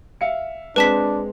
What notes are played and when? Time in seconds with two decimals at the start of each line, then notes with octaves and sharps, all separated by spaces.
0.21 E5 F5 C#7
0.76 G#3 C4 D4 B4 A5 B6